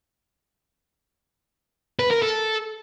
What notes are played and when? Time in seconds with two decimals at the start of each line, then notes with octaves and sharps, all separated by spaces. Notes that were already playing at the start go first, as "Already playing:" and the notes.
1.99 B4
2.11 A#4
2.22 A4